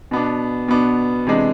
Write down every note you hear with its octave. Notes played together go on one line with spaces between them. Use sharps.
B2 B3 D4
B2 B3 D4
C3 E3 G#3 D4